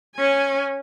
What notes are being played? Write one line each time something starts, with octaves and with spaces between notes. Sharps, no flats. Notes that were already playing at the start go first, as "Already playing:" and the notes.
C#4 G#5